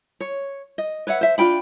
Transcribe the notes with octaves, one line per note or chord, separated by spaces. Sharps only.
C#5
D#5
B4 C#5 E5 F#5
C5 E5
D4 F4 G5 B5